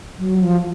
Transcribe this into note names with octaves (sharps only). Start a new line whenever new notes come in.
F#3
F3